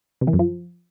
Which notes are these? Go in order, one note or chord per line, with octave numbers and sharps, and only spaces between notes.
C3
E3
F#2
F3